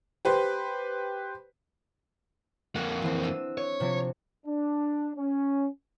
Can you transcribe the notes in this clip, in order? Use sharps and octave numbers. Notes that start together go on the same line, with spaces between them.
G4 B4 C5
F2 A#3 F#5
E3 C4
D4 E6 D#7
C#5
C3 F3 C4
D4
C#4